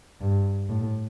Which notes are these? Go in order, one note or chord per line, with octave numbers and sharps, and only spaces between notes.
G2
A2